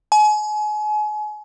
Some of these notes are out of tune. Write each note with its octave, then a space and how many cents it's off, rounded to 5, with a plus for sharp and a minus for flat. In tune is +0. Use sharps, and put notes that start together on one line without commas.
G#5 +35